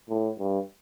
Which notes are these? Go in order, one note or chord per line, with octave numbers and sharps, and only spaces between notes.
A2
G2